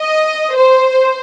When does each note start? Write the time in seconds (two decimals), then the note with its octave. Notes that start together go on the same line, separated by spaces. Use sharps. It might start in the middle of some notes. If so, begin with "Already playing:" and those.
Already playing: D#5
0.54 C5